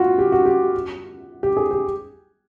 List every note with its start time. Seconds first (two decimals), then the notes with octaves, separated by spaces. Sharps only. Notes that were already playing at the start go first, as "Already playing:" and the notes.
Already playing: F4 F#4
0.19 G4
0.32 F#4
0.46 G4
1.43 G4
1.57 G#4
1.71 G4